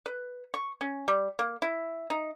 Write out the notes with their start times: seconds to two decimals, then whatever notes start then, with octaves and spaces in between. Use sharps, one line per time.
0.06 B4
0.54 C#6
0.81 C#4
1.08 G3
1.39 A#3
1.62 E4
2.10 D#4